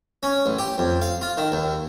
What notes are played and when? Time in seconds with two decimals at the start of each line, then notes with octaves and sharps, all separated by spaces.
0.23 C#4
0.46 A1
0.59 G4
0.78 F2
1.02 F5
1.21 F4
1.37 D#3
1.52 D#2